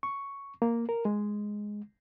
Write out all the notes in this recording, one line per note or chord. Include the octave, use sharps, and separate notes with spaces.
C#6
A#3
A#4
G#3